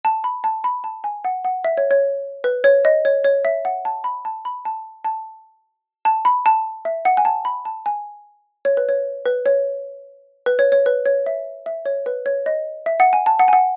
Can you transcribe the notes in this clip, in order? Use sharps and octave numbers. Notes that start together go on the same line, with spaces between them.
A5
B5
A5
B5
A5
G#5
F#5
F#5
E5
C#5
C#5
B4
C#5
D#5
C#5
C#5
E5
F#5
A5
B5
A5
B5
A5
A5
A5
B5
A5
E5
F#5
G#5
A5
B5
A5
G#5
C#5
B4
C#5
B4
C#5
B4
C#5
C#5
B4
C#5
E5
E5
C#5
B4
C#5
D#5
E5
F#5
G#5
A5
F#5
G#5
F#5